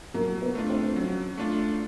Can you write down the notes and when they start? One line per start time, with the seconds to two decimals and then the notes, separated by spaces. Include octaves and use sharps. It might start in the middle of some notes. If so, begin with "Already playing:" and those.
0.14 F#3 A#3
0.42 B3
0.55 A3 D4 F4
0.69 C4
0.96 F#3 C#4
1.37 A3 D4 F4